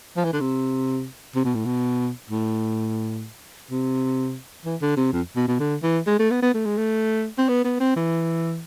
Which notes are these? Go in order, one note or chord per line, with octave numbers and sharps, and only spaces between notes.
F3
E3
D3
C3
C3
B2
A2
B2
A2
C3
E3
D3
C3
F2
B2
B2
D3
E3
G#3
A3
B3
B3
A3
G#3
A3
C4
B3
B3
C4
E3